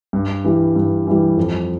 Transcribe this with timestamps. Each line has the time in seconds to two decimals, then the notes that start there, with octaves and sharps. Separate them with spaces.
0.13 G2
0.45 E3 G3
0.76 G2
1.07 E3 G3
1.37 F2